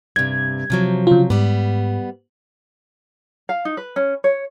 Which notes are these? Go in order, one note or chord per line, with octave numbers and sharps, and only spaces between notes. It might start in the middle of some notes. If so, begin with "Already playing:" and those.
G2 C3 G#6
C3 F3 F#3
C#3 F4
G#2 G3 B3
F5
D#4
B4
C#4
C#5